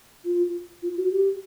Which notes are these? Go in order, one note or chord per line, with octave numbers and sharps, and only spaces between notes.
F4
F4
F#4
G4